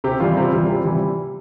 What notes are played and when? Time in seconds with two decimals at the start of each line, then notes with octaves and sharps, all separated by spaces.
0.04 C3 G4
0.20 E3 G3 F4
0.37 C3
0.52 E3 G3
0.68 C3
0.85 E3 G3